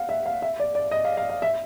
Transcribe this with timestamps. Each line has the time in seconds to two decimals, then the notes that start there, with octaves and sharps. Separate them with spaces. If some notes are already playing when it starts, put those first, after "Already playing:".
Already playing: F5 F#5
0.09 E5
0.26 F5
0.42 E5
0.60 D5
0.75 D5
0.91 D#5
1.05 F5
1.17 F5
1.29 F5
1.42 E5